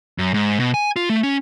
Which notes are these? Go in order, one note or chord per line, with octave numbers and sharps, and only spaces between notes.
F#2
G#2
B2
G#5
F4
A3
C#4